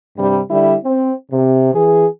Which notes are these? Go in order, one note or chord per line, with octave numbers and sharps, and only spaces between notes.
G2 C3 G3
D3 G3 E4
C4
C3
E3 G#4